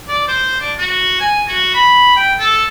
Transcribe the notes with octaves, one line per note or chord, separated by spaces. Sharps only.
D5
C5
D4
F#4
G#5
F#4
B5
G5
A4